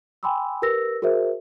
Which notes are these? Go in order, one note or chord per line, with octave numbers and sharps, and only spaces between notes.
G5 G#5 B5 C6 D6 E6
G4 A#4 B4 E6 A#6
F#4 G#4 A#4 C5 E5